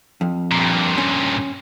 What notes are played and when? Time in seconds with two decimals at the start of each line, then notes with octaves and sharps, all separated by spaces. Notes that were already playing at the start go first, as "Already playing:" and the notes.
0.21 F2
0.51 G2 A#2
0.98 C#4